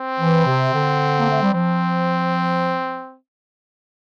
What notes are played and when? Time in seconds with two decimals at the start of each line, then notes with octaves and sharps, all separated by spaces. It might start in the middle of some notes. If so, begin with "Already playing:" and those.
Already playing: C4
0.19 E3
0.47 C3
0.74 D3
1.20 A#3
1.31 A3
1.42 G3
1.53 F3 C4